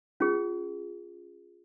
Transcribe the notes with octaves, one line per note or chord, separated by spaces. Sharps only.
C#4 F4 G#4